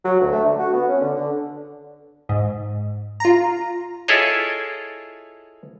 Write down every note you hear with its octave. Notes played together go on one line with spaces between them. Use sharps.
F#3
D2
A3
D3
F#4
B3
C#4
D3
D3
G#2
F4 A#5
E4 F4 G#4 A4 C#5 D#5